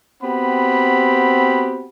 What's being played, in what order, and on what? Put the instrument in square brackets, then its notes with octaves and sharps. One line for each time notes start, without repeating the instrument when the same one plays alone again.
[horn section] B3 C4 F#4 G4 F#5 B5